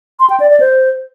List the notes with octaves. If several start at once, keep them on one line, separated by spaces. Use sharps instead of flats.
C6
G5
D5
D5
C5